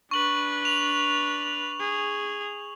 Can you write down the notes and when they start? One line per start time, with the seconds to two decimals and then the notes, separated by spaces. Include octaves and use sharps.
0.11 D4 B4 C#6 F#7
0.65 F7
1.80 G#4